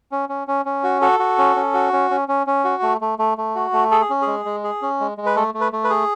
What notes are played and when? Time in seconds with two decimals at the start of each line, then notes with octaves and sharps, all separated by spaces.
0.12 C#4
0.29 C#4
0.48 C#4
0.65 C#4
0.84 F#4
1.01 F#4 A4
1.19 F#4
1.38 C#4
1.56 C#4
1.74 F#4
1.93 C#4
2.11 C#4
2.28 C#4
2.47 C#4
2.64 F#4
2.82 A3
3.01 A3
3.19 A3
3.38 A3
3.55 F#4
3.73 A3
3.91 G#4 A4
4.01 G#4
4.10 C#4
4.22 G#4
4.27 G#3
4.45 G#3
4.64 G#4
4.82 C#4
5.00 G#3
5.18 G#3
5.26 B4
5.36 A3 A4
5.54 A3
5.61 B4
5.73 A3
5.84 B4
5.90 G#4